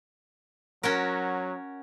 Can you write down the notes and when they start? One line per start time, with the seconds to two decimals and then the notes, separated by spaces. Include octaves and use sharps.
0.83 F#3 C#4 F#4 A#4